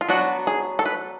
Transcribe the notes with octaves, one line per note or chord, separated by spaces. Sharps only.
F4
F#3 B3 D4 F#4
G#4
A4
B4